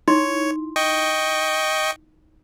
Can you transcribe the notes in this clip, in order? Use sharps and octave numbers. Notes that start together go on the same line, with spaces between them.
D#4 E4 C#5 C6
D#5 G5 C#6